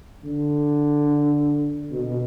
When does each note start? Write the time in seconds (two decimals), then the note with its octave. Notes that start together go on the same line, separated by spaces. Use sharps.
0.25 D3
1.92 B2